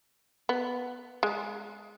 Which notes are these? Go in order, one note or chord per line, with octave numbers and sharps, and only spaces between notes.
B3
G#3